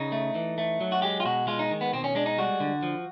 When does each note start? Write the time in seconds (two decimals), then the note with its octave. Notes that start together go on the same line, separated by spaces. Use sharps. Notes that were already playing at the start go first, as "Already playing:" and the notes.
Already playing: C#3 D#4
0.12 A3
0.35 E3
0.58 A3
0.81 F#3
0.92 F#4
1.02 G#3 G4
1.20 F4
1.25 B2 F#4
1.47 G#3 F4
1.59 D#4
1.70 D#3
1.81 B3
1.93 B2 C4
2.04 C#4
2.15 G#3 D4
2.26 D#4
2.38 G3 F#4
2.60 D3
2.83 F3